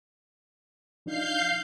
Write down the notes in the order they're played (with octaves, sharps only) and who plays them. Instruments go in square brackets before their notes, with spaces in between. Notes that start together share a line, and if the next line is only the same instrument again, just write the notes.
[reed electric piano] F3 D4 D#4 [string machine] F5 G6 C7